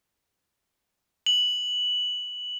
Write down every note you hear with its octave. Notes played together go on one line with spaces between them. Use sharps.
F#7